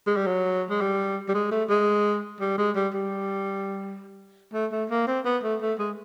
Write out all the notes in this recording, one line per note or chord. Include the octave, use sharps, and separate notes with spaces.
G#3
G3
F#3
G#3
G3
G3
G#3
A3
G#3
G3
G#3
G3
G3
A3
A3
A#3
C4
B3
A3
A3
G#3